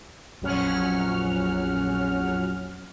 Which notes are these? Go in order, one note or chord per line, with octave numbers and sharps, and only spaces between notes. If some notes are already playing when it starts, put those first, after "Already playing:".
A#1 F2 F#3 C#4 F#5 F6